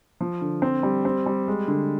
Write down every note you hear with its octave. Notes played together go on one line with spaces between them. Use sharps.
F3
D3
C4
G3
C4
G3
G#3
D3